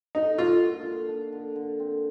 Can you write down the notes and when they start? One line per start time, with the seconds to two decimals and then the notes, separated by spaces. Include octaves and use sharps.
0.15 D3 D#4
0.38 A#3 F4
0.62 D3
0.86 D4
1.09 D4
1.32 D3
1.56 D3
1.79 C4